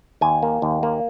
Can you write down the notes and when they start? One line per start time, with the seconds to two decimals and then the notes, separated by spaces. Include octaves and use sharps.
0.21 D#2 G#5
0.43 A#3
0.62 D#2
0.83 A#3